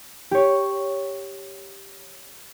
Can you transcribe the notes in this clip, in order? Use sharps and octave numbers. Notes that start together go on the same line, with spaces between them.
G4 C#5